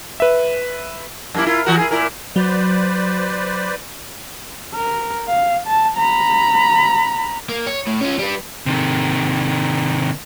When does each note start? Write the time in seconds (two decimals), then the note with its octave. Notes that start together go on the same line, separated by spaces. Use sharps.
0.20 B4 E5
1.34 F#2 A#3 E4
1.46 E4 F4
1.65 E3 F#4 A#4
1.77 E4 G#4
1.91 A#2 E4 A#4
2.36 F#3 B4 C5 D5
4.75 A#4
5.28 F5
5.67 A5
5.97 A#5 B5
7.49 A#3
7.67 C#5
7.87 A2
8.01 C#4 F4
8.19 G3 B4
8.66 C3 D#3